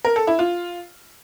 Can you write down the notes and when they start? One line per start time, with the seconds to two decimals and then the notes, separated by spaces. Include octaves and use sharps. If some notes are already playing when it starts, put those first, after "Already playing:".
0.05 A#4
0.16 A4
0.27 E4
0.39 F4